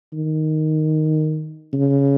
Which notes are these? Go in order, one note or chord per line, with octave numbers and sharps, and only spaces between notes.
D#3
C#3